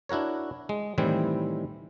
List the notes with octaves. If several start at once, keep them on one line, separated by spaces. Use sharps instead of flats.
D4 E4 F#4 A#4 C#5
G#3
A2 D#3 E3 G3 C4 E4